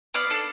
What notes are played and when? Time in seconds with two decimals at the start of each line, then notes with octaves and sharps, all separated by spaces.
0.14 B3 D5 F5
0.30 D4 A4